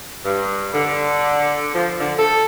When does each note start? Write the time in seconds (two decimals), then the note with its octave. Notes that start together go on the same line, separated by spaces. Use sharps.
0.24 G2
0.73 D3
1.74 F3
2.00 D3
2.18 A4